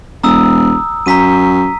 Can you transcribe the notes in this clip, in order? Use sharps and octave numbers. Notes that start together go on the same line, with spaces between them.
E1 A#5 D#6 E6
F#2 A#5 B6 D#7